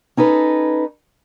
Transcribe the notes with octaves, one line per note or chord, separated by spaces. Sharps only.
C#4 D#4 A4 B4